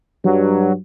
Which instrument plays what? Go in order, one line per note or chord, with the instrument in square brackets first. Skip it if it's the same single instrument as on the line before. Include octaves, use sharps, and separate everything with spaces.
[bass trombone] G2 [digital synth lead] F#3